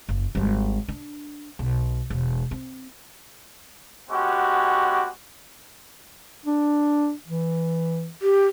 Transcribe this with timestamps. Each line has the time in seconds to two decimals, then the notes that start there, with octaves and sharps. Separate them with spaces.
0.09 F#1
0.35 G#1 G3
0.88 D4
1.59 B1
2.10 E1
2.51 C4
4.10 G#3 B3 C#4 F#4 G4
6.46 D4
7.27 E3
8.22 G4